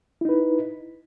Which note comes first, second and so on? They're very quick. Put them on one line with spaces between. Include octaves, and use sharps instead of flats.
E4 D#4 B4